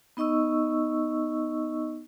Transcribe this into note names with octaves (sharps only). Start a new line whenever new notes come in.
B3 D#4 D#5 C#6 E6